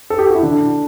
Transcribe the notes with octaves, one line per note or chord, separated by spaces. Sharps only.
A4
G4
F#4
E4
D3 D4
D3